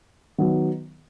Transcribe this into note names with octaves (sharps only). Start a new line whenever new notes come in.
D#3 F#3 B3